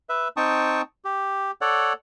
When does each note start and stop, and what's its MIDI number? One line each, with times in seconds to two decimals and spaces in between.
0.09 0.28 71
0.09 0.28 76
0.37 0.82 60
0.37 0.82 63
0.37 0.82 79
0.37 0.82 81
0.37 0.82 85
0.37 0.82 87
1.05 1.51 67
1.61 1.93 69
1.61 1.93 73
1.61 1.93 74
1.61 1.93 78